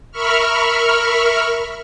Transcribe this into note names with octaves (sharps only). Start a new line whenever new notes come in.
A#4 E5 B5 C#6 F6